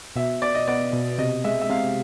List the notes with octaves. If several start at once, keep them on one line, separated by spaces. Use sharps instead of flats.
B2 E5
B2 D5
D#5
B3 D5
B2
C3 D#5
G#3 E5
E5
C3 F5